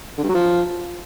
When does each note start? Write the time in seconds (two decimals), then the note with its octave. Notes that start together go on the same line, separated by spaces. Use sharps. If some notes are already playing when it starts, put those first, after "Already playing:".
0.18 D3
0.23 G2
0.29 F#3
0.34 F3